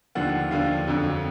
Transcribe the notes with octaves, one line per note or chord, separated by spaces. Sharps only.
D#2 D3 F3 F#5
D#2 D3 F3 F5
F2 D3 F#3